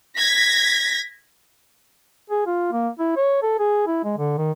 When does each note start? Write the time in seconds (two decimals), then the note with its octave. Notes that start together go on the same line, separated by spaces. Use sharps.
0.18 G#6 A#6 B6
2.30 G#4
2.46 F4
2.72 A#3
2.99 E4
3.17 C#5
3.42 A4
3.59 G#4
3.87 E4
4.04 G#3
4.18 D3
4.38 D#3